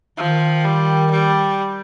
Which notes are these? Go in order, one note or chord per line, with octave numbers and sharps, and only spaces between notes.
D#3 F3
G3
G3